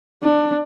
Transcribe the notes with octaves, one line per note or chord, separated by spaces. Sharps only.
D4